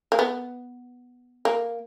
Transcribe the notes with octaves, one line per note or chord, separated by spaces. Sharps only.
A#3
B3
A#3